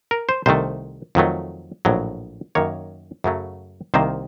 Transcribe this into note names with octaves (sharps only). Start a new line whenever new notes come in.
A#4
C5
C2 C3 D#3 A3 C5
F2 D#3 F#3 A3
A#1 A2 F#3
F#2 D#3 A#3 C#5
F#2 C#3 F#3 A3
C2 C3 D#3 A#3 C5